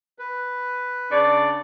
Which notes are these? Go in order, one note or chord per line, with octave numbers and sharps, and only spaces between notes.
B4
C#3 D4 D5